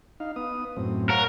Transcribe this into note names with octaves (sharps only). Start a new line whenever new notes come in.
D#4 F5
B3 D#6
F#2 A2 C4
A#4 C#5 F5 F#5